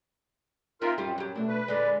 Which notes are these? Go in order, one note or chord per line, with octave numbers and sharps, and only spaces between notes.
C4 D#4 F4 A#4 E5
F#2 G3 F4 G4
F#3 G4
B2 A3 D4
B4
A#2 D3 G#3 D5